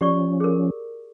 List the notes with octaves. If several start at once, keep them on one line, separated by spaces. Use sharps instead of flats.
F3 C#4 G4 D5 C#6
G#4 A#4